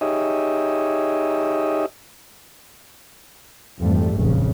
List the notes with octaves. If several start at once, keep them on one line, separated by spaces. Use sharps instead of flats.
D#4 G4 G#4 C#5 D#5 E5
F2 G#2 E3 F3 G3 A3
F1 A#1 F#2 C#3